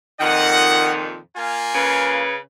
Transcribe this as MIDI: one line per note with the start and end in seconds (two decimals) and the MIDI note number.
0.20 1.18 41
0.20 1.18 46
0.20 1.18 51
0.20 0.91 75
0.20 0.91 78
1.37 2.22 58
1.37 2.22 65
1.37 2.22 80
1.74 2.36 49
1.74 2.36 71